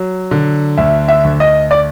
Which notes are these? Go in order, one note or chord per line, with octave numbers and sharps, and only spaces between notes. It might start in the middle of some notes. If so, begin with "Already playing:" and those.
Already playing: F#3
D3
D2 E5
E5
D2
D#5
D5